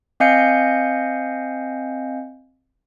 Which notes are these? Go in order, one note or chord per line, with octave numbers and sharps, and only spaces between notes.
C4 D#5 F5 G#5 G6 C#7